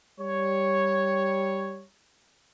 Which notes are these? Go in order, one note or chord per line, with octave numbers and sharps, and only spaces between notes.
G3 C#5